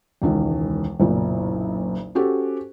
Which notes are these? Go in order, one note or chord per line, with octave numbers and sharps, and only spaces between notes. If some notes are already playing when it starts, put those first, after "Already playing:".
E1 C#2 D#3
F#1 B1 A#2
C#4 F#4 G4 A4 C5